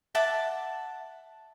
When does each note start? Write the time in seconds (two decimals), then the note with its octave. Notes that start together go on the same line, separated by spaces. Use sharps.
0.15 E5 F#5 A5 D6